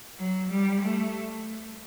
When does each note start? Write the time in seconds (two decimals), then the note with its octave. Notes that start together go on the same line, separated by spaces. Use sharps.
0.19 F#3
0.51 G3
0.82 A3